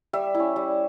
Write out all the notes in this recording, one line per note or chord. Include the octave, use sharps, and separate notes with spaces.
G3 E5
E4
C#4
G3